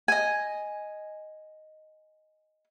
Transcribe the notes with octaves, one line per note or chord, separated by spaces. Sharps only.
D#5 G#5